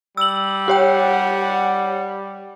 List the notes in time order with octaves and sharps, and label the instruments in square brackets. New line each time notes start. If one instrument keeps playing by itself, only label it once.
[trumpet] G3 [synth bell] E6 F#7
[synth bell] G4 C#5 G5 [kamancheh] F#5